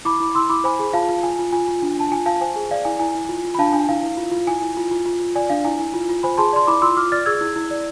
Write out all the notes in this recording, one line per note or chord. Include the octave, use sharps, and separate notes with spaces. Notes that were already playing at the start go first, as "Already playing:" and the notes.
E4 B5 D6
E4
E4 C6 E6
E4 B5 D6
C5 G#5 B5
G#4
F4 F5 A5
F4
F4 G#5
F4
F4 G#5
F4
D4
D4 A5
F4 G#5
F4 F5 A5
C5 G#5
G#4
D5 F5
E4 G#5
E4 G#5
E4
F4
F4
B5
D4 F5 A5
D4 G#5
E4 F5
E4
F4
F4
E4 G#5
E4
F4
F4
F4
F4
D5 G#5
D4 F5
E4 G#5
E4
F4
F4
C5 G#5 B5
G#4 A5 C6
D5 C6
E4 B5 D6
F4 C6 E6
F4 D6 F6
D5 F6 A6
G#4 E6 G#6
E4
E4
D5